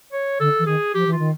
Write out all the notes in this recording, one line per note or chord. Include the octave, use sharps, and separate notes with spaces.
C#5
D3 A4
E3
D#3 G#4
F3 G4
E3
F4
D#3